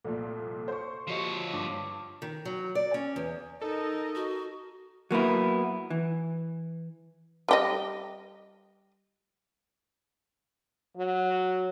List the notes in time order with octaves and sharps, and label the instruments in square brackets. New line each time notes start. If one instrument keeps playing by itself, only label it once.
[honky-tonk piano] C2 F2 A#2 [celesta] A4 D5
[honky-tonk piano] C5 C#6
[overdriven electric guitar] F3 C#5 [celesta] F#4 G4 D#5
[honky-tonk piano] G2 [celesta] D6
[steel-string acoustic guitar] D#3
F#3
D5
C#4
E2
[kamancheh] D#4 A#4 [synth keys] A4 [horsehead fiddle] D#5
[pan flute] F#4
[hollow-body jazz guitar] F#3 A#3 B3 E4
E3
[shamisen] G3 G4 D#5
[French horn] F#3